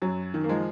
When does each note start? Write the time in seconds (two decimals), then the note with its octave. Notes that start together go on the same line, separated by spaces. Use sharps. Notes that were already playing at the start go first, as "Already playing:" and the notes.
0.02 F#2 F#3
0.34 D#3
0.44 A#3
0.49 F3 G#3